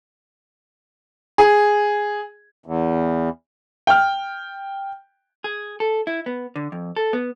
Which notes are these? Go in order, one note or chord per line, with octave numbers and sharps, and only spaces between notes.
G#4
E2
G5 F6
G#4
A4
E4
B3
D3
F2
A4
B3